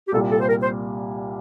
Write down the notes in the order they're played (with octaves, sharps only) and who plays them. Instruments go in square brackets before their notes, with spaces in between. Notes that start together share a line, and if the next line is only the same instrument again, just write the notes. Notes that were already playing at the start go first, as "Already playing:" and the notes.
[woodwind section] G4
[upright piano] C2 A#2 G3 [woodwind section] A4
[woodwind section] A4
C5
A#4
C5